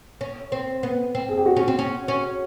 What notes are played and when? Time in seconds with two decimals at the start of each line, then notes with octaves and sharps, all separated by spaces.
0.21 C#4
0.52 C4
0.83 B3
1.15 C4
1.29 G#4
1.38 G4
1.46 F#4
1.56 C#4
1.68 C4
1.79 C#4
2.08 C#4